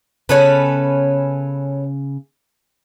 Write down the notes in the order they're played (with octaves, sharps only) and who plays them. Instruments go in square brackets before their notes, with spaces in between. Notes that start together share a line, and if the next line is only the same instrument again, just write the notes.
[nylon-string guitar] C#3 B3 [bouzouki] C#4 A4 B4